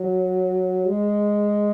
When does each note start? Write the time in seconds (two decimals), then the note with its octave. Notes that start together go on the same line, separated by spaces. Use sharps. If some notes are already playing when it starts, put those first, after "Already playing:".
Already playing: F#3
0.87 G#3